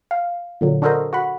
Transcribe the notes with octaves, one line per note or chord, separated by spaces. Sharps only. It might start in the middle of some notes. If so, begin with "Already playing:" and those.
F5
A#2 D3 F#3
D4 F#4 A4 A#4 C5 D#5
F#4 F#5 B5